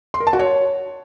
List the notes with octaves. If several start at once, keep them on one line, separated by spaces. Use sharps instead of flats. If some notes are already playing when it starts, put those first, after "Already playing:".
C6
A#4
A5
F#4
C#5